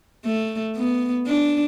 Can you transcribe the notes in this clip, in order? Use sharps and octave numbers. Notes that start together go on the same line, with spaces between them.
A3
B3
D4